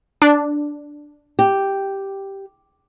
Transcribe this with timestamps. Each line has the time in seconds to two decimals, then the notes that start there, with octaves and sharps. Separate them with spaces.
0.22 D4
1.39 G4